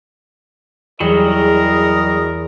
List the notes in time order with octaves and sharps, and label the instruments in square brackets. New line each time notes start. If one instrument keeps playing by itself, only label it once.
[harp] E2 G#4 [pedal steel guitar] F#3 G3 [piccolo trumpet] A#4 [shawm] D#5